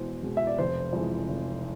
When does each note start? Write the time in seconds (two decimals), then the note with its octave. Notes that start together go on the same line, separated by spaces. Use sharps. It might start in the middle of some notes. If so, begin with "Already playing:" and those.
Already playing: E2 B2 G#3 C5
0.23 B2 G#3
0.37 E5
0.47 D5
0.58 F1 C5
0.93 F2 E3 G#3
1.28 F1